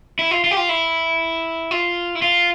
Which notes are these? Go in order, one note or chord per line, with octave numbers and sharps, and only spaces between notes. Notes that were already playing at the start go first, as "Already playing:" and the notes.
E4
F4
F4
G4
F4
E4
F4
E4
F4